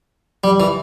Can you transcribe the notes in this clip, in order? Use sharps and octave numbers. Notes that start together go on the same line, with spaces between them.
G3
E3